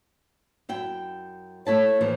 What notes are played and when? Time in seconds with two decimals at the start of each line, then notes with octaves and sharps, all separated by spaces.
0.69 F#2 E4 G5
1.67 A3 E4 C#5 A5
2.01 A#2 E3 F3